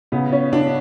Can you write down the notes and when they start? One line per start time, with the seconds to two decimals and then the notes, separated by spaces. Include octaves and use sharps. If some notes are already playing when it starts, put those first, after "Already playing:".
0.12 C#3 B3
0.32 C#4
0.53 C#3 D4